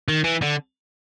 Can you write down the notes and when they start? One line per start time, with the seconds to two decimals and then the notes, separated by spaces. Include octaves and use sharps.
0.08 D#3
0.24 E3
0.42 D3